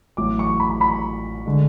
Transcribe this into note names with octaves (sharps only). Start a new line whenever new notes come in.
A1 A2 F#3 D6
C#6
B5
B5
D3 G#3